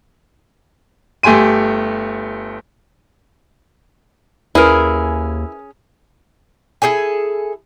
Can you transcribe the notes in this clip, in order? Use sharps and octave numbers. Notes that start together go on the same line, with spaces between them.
G1 A3 G4 G#5 C6 D#7
D#2 C#4 E4 G#4 A#4 B4
E4 G#4 A4 G#5